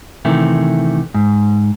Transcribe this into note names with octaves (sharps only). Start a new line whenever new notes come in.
C3 D#3 E3 A3
G#2